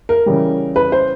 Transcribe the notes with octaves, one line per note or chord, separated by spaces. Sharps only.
A#4
C#3 E3 G3
B4
C5